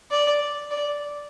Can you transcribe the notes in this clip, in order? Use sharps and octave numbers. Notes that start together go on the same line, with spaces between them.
D5
D5